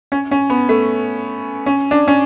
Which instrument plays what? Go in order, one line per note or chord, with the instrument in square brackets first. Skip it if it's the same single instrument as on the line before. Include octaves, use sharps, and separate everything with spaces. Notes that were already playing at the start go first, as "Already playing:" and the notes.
[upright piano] C#4
C#4
B3
A3
C#4
D4
C#4